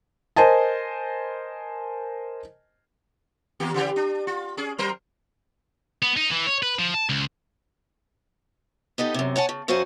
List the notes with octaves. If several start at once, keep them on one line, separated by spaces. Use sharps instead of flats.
A#4 C5 D#5 G#5 A5
D#2 A#3 G4
C#3 E3 G4
D4
F4
C#4 G#4
F#3 A#4 C5
B3
D#4
E3
C#5
B4
F3
A5
C#2
B3 D#4 G4 A4
F#2 C3
C#5 F#5 G#5 A5
C#3
F#2 F#4 C5 F5 F#5 G#5